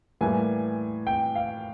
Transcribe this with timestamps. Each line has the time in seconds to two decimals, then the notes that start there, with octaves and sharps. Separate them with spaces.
0.21 A2 E3 G3 A#3 G#5
1.07 G5
1.35 F5